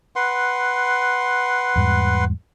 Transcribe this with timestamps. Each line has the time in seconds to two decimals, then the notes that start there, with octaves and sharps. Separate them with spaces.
0.16 B4 F#5 C6
1.76 E2 G#2 G3